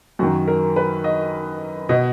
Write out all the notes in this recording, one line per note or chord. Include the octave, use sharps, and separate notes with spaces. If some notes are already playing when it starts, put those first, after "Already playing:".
F#2 D#3 F#4
A#4
B4
D#5
B2 D#5